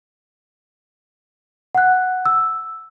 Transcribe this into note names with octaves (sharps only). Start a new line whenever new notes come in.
F#5 F#6
E6